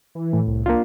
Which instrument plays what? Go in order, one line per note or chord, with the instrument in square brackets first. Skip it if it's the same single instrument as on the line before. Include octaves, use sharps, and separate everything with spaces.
[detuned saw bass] E3
[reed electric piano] A2
[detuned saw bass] C2
[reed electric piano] A#3 D4 F4